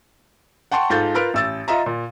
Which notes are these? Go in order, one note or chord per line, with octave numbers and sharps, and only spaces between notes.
F#5 G5 A5 C6 C#6
G#2 F4 A4 G6 A6
F4 A#4 B4 F6 D7
A1 E6 A6
F4 D#5 E5 A#5
A#2